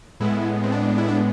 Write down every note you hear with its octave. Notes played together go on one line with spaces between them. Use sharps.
A2 G#3 B3 E4
C4
D4
E4
D4